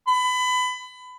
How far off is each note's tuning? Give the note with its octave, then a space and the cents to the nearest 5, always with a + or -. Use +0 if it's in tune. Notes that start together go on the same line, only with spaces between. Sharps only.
B5 +25